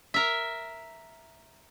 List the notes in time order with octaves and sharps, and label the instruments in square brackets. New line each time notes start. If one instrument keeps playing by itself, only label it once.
[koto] A#4 E5